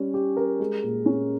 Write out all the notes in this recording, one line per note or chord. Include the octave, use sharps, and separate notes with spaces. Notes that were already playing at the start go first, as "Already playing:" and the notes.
Already playing: G3 C#4
G4
A#4
G#3
A#2
C#4